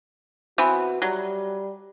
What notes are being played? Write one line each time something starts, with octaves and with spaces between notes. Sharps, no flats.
E3 B3 C4 F#4
F#3 G3